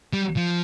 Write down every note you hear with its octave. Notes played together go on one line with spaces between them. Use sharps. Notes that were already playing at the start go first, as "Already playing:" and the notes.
G3
F3